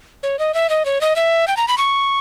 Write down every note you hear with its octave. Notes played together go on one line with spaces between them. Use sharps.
C#5
D#5
E5
D#5
C#5
D#5
E5
G5
A#5
B5
C#6